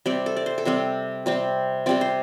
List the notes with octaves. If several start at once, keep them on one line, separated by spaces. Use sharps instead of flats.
C3 G3 C4 D5
A4
D5
C5
A4
C3 G3 C4 C5
C3 G3 C4
C3 G3 C4 D5
C5